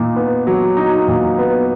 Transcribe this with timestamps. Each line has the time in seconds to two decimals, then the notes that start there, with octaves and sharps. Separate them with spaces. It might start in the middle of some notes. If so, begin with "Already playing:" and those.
Already playing: A#2 D#4
0.16 B3
0.47 F#3
0.77 D#4
1.08 A#2
1.38 B3